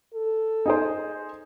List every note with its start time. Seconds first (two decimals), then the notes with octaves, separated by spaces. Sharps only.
0.14 A4
0.66 D#4 G#4 C5